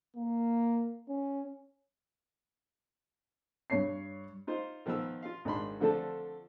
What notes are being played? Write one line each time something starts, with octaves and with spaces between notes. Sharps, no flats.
A#3
C#4
G2 C#5 C7
D#4 F4 C5
D#3 F3 B3 A#4 E6
F4 F5
G#1 D#3 D4 B5 C6
D3 F3 A3 C4 D4 A4